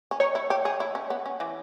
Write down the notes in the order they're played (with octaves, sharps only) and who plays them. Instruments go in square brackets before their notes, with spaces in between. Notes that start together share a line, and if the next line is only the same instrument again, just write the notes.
[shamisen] C#4
[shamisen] D#4 [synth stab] C#5
[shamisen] E4
G4
G#4
E4
C#4
B3
C#4
E3